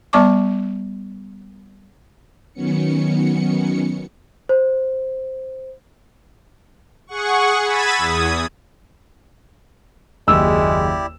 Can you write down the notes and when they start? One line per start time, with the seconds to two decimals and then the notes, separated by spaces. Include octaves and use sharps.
0.13 G3 B3 D5 A5 C#6 D6
2.53 D#3 F#3 B3 C#4 C#7
4.49 C5
7.07 G#4 F#5 C#6
7.64 B5 E6 G#6 A6 B6 D#7
7.98 E2 D#6 G#6
10.28 F#1 D#2 G#3 E4 G4 D5 E6